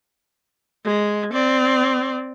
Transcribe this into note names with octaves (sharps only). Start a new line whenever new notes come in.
G#3
C4 D5